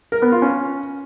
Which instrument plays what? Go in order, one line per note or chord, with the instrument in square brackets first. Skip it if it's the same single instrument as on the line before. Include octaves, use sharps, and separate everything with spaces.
[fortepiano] A#4
B3
F4
C#4